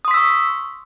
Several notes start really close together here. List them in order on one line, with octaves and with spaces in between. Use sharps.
D#6 C6 B6 E6 C#6